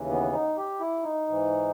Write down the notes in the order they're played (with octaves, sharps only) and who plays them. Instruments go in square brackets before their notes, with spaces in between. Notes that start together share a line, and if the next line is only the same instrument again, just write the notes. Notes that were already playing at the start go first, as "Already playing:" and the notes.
Already playing: [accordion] D#2 C#3 E3
B3
D#4
G4
E4
D#4
G#2 E3